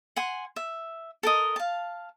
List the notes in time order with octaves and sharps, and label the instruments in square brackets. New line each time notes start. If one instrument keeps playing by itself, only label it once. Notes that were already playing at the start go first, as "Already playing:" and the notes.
[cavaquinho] F#5 G#5 C6
E5
A4 A#4 D#5
F5 A5